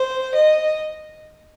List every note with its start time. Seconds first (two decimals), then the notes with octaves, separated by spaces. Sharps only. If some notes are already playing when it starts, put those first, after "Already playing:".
Already playing: C5
0.34 D#5